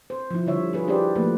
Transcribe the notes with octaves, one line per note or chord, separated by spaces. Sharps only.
C5
F3 E4
D3 G3 C#5 E5
F4 G#4 B4
D4 E4 G4 B4 C5 D5
F3 A3 A#3 B4